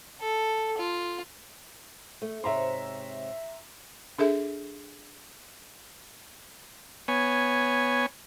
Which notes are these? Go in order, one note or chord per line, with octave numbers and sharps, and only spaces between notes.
A4
F4
A3
G#2 C3 C#5 E5 A#5 C6
D4 G#4 A4 E5
B3 C#5 G#5